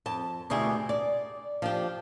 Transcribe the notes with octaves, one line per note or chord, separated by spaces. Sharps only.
F2 A5
D2 B2 E4 G4 G#4
D5
F3 D4 G4